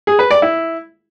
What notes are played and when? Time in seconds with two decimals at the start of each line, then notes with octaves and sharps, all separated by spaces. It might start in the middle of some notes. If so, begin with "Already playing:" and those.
0.07 G#4
0.19 B4
0.31 D5
0.42 E4